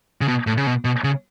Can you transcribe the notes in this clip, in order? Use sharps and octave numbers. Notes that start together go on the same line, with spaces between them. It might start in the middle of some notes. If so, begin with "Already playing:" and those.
C#3
B2
A2
C#3
B2
B2
C#3